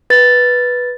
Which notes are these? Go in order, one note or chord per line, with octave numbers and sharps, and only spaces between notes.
B4 A6